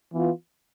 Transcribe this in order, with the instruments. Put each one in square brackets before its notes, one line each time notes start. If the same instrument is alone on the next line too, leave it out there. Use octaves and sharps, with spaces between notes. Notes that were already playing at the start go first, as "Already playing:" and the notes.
[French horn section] E3 B3 F4